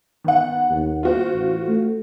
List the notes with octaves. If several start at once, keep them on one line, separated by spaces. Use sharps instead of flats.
D#3 B3 F#5
D#2
F4 F#4 C5
A1
A3